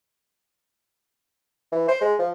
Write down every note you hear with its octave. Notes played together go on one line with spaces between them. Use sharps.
E3
C5
G#3
F3